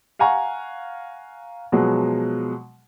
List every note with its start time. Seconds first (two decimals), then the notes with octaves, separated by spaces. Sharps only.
0.19 F5 F#5 G#5 A#5 C#6
1.72 B2 F3 F#3 G#3